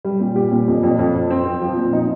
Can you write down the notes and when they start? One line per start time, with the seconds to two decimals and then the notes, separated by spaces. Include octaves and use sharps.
0.05 G3
0.20 A#2
0.36 G4
0.52 A#2
0.68 F2
0.83 F2
0.99 F2
1.15 F2
1.30 C4
1.46 C4
1.61 F3
1.77 A#2
1.93 D#4